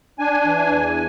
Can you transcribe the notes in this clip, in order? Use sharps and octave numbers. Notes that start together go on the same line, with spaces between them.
D4 G#5
E3
E2